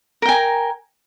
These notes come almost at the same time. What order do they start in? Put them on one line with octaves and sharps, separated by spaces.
A#4 G5 G#5 A#5